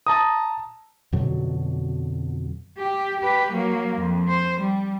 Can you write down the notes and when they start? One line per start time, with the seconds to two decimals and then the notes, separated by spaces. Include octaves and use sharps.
0.07 A5 A#5 D#6
1.13 F2 B2 D3 F#3
2.78 G4
3.21 G4 B4
3.52 F#3 A#3
3.98 F2
4.28 C5
4.61 G3